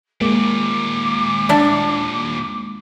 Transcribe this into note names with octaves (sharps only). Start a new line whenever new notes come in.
D#2 A#2 G#3 A#3 D6
D4 E4